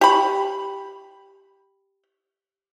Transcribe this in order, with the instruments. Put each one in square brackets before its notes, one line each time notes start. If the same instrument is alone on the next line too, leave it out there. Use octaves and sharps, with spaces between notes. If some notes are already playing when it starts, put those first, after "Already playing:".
[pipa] G4 B5